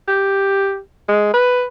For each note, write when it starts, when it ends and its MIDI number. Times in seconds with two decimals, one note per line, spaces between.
0.08 0.78 67
1.08 1.31 56
1.34 1.65 71